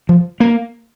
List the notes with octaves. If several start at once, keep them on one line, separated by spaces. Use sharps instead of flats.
F3
A#3